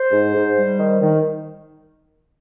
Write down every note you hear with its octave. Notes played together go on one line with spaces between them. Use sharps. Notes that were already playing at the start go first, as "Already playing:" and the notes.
Already playing: C5
G#2
G#2
G3
D#3
D#3